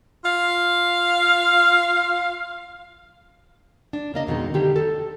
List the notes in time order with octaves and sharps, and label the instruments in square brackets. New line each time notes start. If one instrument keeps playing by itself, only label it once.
[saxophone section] F4 F5
[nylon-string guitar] D4
C#3 A#3 D#5
F2 B2 D#3 G#3
D3 D#3 G3 A#3 G4
A4